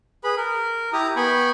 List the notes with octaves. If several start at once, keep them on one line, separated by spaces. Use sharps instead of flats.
G#4 B4 B5
A#4
E4 G4 A#5 D#6
B3 G5 G#5 B5 C#6